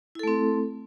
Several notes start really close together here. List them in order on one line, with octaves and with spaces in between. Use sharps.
E4 A4 A3 C4